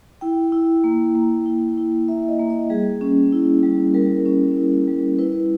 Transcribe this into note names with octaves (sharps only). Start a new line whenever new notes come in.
E4 G5
E4
A#3
A#3
E4
E4
A#3 E5
D#5
A#3
D#5
G3 G#4
C#4
E4
G3
G3 A#4
C#4
E4
G3
E4 B4